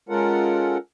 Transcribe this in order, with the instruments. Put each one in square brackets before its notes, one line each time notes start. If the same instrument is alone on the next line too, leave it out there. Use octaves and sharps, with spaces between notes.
[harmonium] G#3 C#4 F4 A4 A#4 F#5